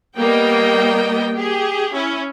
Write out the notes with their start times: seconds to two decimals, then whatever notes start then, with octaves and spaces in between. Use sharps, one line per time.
0.17 G3 A#3 B3 D#5 G5
1.35 G4 G#4
1.92 C#4 E4